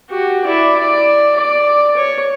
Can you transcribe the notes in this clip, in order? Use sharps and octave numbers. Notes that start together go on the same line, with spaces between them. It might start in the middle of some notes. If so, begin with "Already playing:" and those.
F#4 G4
E4 D5
D5
D5
C#5